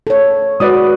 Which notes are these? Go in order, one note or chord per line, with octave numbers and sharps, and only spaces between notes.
A4 C#5
G#3 F#4 B4 D5 D#6